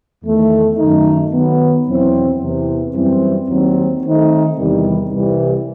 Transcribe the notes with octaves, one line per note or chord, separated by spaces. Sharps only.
E2 D#3 A3
F#2 D#3 A3 D#4
D#3 F#3 B3
E2 B2 F#3 C4 E4
E2 C3 E3
F#2 E3 G3 C4
D#2 D#3 F#3 C4
D#3 A3 C4 D#4
E2 C3 D#3 G3
C2 C3 E3 G3